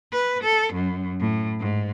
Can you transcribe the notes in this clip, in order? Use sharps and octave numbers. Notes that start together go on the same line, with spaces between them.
B4
A4
F#2
A2
G#2